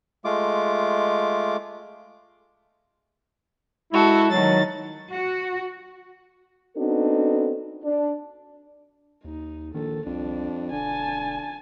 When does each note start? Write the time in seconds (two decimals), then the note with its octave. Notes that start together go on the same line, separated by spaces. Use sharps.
0.25 G#3 A3 F4 D6
3.93 G#3 E4 F#4 A4
4.31 D#3 F#3 A6
5.13 F#4
6.76 B3 C4 D4 D#4 F#4 A4
7.83 D4
9.24 D#2 D#4
9.74 A#1 D#3 A4
10.06 C2 F2 D4
10.72 E1 D3 G#5 A5